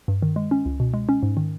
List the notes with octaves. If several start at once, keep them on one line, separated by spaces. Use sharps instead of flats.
G2
D#3
G#3
C#4
C#2
B2
G#3
C#4
G#2
D#3